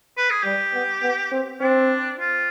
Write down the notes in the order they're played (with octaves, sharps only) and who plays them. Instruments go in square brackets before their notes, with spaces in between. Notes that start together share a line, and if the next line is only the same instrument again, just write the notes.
[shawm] B4
G#4
[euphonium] G3 [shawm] G4
[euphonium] B3
B3
C4
[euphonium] C4 [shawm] D4
[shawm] F4